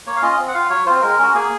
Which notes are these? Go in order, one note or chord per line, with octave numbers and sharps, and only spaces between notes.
A#3 C#5
F5
C#4 F4 D#5
C4
F#5
F4 F5
F#3 C#5
C4 F4 C5
C5
G#3 A#4
C#4 F#4
A#3 G#4